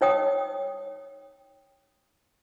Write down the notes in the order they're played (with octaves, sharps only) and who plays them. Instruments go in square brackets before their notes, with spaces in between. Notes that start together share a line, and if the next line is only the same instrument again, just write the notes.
[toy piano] D#4 C#5 G5 D#6